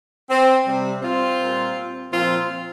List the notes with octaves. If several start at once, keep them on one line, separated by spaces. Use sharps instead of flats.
C4
C3 G3
C4 F4
A#2 G3
A#2 F3 C4 F4